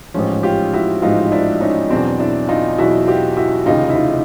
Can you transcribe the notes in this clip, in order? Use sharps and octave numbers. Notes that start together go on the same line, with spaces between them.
A1 G#2 F3 C#4
F4 G4
E4 F#4
A1 G#2 F3 D#4 F4
D4 E4
C#4 D#4
E2 B2 F#3 C4 D4
D4 E4
D#4 F4
E2 B2 F#3 E4 F#4
F4 G4
E4 F#4
F1 D#2 C#3 D#4 F4
E4
D#4 F4